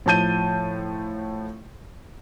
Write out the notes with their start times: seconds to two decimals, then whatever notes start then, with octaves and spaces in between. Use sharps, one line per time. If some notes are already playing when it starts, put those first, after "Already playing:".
0.06 A2 F3 A5 G6 D#7